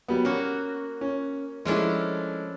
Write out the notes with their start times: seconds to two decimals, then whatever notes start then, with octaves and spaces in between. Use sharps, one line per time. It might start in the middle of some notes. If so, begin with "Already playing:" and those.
0.08 F#3 G3 B3
0.25 A#3 C#4 F#4
1.01 C#4
1.65 F3 G#3 A3 C#4 D4 E4